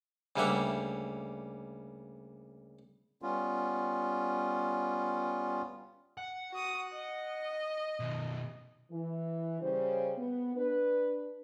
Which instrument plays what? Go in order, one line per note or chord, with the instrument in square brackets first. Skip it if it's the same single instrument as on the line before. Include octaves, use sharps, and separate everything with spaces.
[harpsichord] D2 C#3 G3 A#3 E5 F#5
[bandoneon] G3 B3 C#4 F4
[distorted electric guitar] F#5
[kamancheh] F#4 D#6
D#5
[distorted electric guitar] B2 D#3
[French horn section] E3
C#3 G3 C5
B3
D4 B4